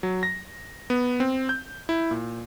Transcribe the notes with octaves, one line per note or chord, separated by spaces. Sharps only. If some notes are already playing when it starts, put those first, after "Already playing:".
F#3
A#6
B3
C4
G6
E4
A#2